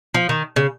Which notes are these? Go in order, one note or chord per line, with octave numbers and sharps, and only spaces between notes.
F3
D#3
C#3